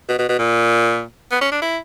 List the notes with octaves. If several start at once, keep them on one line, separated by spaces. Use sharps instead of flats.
B2
B2
B2
A#2
B3
C#4
D4
E4